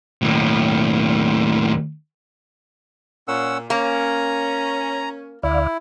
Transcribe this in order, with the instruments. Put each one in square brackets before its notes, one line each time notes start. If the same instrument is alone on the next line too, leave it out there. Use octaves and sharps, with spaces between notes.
[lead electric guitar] D#2 A2
[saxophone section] A#2 [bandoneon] C#4 F#5 E6
[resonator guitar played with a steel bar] A#3 [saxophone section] C#4 [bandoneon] A#5
[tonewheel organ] D2 D5 F5 [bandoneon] E4